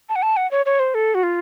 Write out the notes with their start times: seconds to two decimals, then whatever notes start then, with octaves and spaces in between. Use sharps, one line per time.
0.09 A5
0.16 F#5
0.22 A5
0.37 F#5
0.51 C#5
0.66 C#5
0.80 C5
0.95 A4
1.15 F#4
1.23 F4